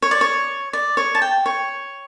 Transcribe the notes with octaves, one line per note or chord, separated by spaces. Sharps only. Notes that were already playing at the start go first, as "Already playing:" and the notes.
C#5
D5
C#5
D5
C#5
A5
G5
C#5